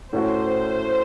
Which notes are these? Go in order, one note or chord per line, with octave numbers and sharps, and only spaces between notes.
A2 A3 C#4 F#4 C5